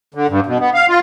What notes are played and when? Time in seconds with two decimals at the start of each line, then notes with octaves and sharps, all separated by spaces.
0.14 D3
0.29 G2
0.46 B2
0.59 B3
0.74 F5
0.88 F4